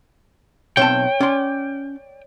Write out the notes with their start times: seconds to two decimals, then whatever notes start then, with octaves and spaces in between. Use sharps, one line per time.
0.77 B1 C4 C#5 G5 A5
1.21 C#4 D5 C6